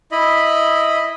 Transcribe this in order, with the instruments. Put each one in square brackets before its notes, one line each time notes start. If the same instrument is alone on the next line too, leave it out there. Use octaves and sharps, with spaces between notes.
[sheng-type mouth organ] E4 D#5 B5